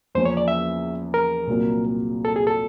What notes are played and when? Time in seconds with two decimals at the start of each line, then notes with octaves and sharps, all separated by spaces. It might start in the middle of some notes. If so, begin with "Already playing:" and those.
0.15 E2 C#3 F3 A#3 C#4 C5
0.25 C#5
0.37 D5
0.48 E5
1.14 A#4
1.47 C2 A#2 F#3 A#3
2.25 A4
2.36 G#4
2.47 A4